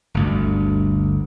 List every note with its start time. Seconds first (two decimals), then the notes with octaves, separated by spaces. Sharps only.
0.14 G1 D2